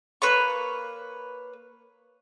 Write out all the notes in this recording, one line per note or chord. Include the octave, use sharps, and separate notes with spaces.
A#3 B4 C#5 C#6